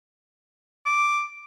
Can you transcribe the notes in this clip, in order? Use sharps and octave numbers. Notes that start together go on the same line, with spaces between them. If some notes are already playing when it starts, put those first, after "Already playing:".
D6